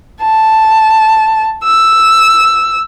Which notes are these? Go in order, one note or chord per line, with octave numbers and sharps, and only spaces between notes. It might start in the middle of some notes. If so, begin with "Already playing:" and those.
A5
E6